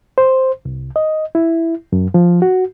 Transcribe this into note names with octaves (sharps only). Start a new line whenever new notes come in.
C5
C2
D#5
E4
F#2
F3
F#4